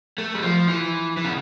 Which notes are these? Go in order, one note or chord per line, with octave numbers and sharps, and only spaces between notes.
A3
G3
F3
E3
E3
C#3